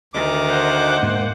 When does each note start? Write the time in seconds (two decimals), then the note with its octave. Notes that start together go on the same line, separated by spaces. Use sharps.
0.14 D2 D#3 D6
0.48 C5 F#5
1.03 G#2 A#3